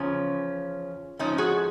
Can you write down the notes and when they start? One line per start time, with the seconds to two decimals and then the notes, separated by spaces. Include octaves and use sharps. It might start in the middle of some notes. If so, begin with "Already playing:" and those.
Already playing: E2 C#3 F3 C#4
1.19 G#2 F3 C#4 D#4
1.38 F#4 G#4